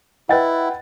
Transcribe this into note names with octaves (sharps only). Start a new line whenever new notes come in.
E4 B4 D#5 F#5 G5 A6